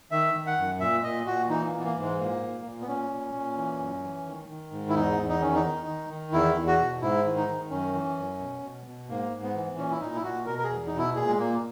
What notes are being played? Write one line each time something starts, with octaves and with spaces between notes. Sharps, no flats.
D#3 E5
D#3
F#5
F#2
A#2 E5
A#2 D#5
A#2 F#4
E3 D#4
A#3
E3
B3
A#3
G#2
G#3
A#2 A#3
A#2
A#2
B3
A#2 C#4
A#2
A#2
E3
F#2
E3
D#3
D#3
G#2
E4
E2 D#4
E2
D#4
D#3 C#4
D#4
D#3
D#3
D#3
E2 E4
E2
F#4
B2
G#2 E4
D#3
D#4
D#3
F#2 C#4
E3
F#2
B2
B2
B2
G#2 A#3
G#2
B3
E3
A#2 C#4
E4
A#2 D#4
E4
A#2 F#4
B2 A#4
A#4
G#4
E2
D#4
B2
E4
A#2 G#4
G#3
A#2 A#3